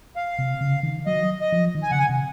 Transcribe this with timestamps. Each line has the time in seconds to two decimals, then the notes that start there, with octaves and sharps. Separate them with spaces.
0.16 F5
0.39 C3
0.61 C#3
0.83 D#3
1.06 F#3 D#5
1.41 D#5
1.52 F3
1.75 D#3
1.83 G#5
1.91 C#3 F#5
1.99 G#5
2.09 C3